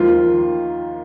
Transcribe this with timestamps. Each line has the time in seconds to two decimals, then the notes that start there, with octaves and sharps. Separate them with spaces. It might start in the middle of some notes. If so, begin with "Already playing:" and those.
Already playing: D#2 F3 F4
0.13 D#2
0.32 D#3